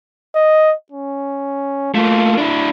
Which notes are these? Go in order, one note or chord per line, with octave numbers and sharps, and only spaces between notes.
D#5
C#4
A3 A#3 F4
D4 E4